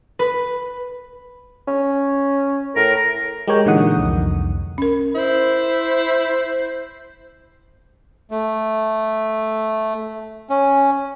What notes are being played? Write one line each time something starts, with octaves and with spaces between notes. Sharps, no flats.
B4
C#4
A2 A#4
G#3 G4 A#4 C#5 G5
A#2 D3 E3 D#4 F#5 D#6
C2 F2
C#4 A#4
E4 C5
A3
C#4